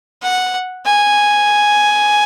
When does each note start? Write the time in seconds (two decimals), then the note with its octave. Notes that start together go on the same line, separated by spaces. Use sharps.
0.22 F#5
0.86 G#5